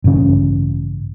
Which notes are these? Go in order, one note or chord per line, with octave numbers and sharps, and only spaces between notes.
A1 G2 C#3 C#4